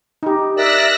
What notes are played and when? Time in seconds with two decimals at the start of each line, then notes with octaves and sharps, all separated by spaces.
0.23 D#4 G4
0.56 A#4 D5 E5 E6 F#6 A#6